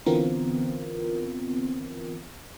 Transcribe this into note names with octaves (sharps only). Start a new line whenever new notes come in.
D3 E3 B3 C4 F4 A#4